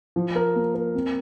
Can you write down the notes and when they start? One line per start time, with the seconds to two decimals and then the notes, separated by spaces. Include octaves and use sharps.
0.16 F3
0.36 A#4
0.55 A#3
0.75 A#4
0.95 C4